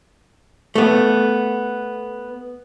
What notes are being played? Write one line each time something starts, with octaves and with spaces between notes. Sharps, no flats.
A3 B3